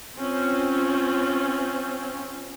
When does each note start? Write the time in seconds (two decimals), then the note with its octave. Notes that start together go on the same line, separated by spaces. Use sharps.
0.18 C4 C#4 F4